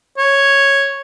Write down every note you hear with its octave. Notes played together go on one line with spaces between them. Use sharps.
C#5